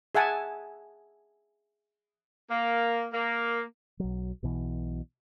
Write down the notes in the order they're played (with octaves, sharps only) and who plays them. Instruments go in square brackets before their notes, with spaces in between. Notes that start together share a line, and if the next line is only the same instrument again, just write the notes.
[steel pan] G#4 E5 F#5 G#5 A5
[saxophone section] A#3
A#3
[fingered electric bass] B1 F#3
B1 B2 E3